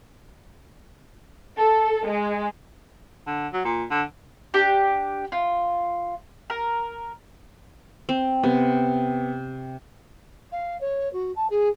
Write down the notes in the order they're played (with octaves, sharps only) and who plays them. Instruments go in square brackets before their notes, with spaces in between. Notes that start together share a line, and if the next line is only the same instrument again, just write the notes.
[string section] A4
G#3
[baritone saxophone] D3
F#3
A#2
D3
[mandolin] D4 G4
F4
A#4
[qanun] C4
[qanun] C3 [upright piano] B3
[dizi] F5
C#5
F#4
A5
G#4